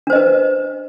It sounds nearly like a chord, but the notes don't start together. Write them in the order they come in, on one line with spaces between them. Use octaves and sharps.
D4 C5 D#5 B4